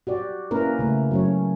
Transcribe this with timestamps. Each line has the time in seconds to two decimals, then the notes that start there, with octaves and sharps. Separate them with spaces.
0.07 F#4 G4 D5
0.51 A#3 C#4 E4 A#4 B4
0.79 C#3 A3
1.11 F#3 C#4 C#5